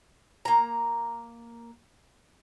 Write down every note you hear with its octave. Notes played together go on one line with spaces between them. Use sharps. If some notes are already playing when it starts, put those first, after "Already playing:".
A#3 A#5